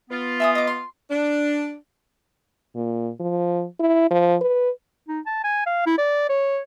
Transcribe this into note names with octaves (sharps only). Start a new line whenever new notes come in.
B3 F4
E5 G#5 D#6
D#5 D6
C6
D4
A#2
F3
E4
F3
B4
D#4
A5
G#5
F5
E4
D5
C#5